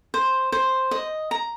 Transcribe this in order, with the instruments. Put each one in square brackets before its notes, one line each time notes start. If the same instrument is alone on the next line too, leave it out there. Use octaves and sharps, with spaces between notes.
[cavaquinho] C5
C5
D#5
A#5